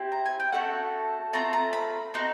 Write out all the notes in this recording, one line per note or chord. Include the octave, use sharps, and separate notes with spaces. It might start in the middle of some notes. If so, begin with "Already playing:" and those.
Already playing: C4 E4 G4
A#5
G#5
G5
A3 C#4 F#4 A4 F#5
A3 C4 F4 A#5
A#5
B5
C4 D#4 F#4